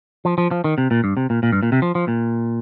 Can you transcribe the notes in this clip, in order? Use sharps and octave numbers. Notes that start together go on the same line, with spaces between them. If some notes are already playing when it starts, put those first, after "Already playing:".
F3
F3
F3
D#3
C3
A#2
G2
C3
A#2
A#2
G2
A#2
C3
F3
F3
A#2